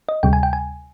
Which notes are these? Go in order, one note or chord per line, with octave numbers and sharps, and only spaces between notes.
D#5
D2 C3 G3 G5
G#5
G5
G#5